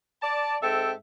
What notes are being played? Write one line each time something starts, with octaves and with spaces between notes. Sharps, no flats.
D5 A5
G#2 C4 A4 E5 G5